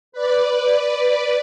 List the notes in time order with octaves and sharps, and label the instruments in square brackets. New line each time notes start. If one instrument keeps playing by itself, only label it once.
[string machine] B4 D5